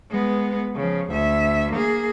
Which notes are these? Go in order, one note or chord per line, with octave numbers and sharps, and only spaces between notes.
G#3 B3
C#3 F3
D2 E5
A#3 G#4